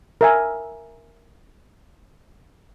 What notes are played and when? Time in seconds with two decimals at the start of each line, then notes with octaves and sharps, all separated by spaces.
0.21 A#4 E5 G#5